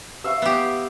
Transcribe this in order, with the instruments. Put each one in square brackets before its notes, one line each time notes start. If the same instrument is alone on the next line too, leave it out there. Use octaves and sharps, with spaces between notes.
[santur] E5 F5 C#6
[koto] B3 G4